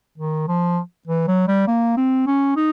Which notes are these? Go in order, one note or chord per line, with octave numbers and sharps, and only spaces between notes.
D#3
F3
E3
F#3
G3
A#3
C4
C#4
D#4